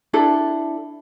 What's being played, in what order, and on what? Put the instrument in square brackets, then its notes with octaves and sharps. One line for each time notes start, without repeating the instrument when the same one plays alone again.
[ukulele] D4 E4 A4